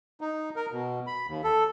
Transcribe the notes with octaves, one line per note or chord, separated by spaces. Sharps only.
D#4
A#4
B2
B5
D#2
A4